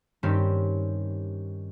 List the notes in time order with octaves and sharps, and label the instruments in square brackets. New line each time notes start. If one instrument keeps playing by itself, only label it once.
[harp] G2 D#3 C4 C#4 G4 C6